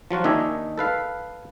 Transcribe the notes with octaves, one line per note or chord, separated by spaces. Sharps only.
F3 F#3 F4 F#4
D#2 D#3 D4 D#4 E5 G#5
A4 B4 F5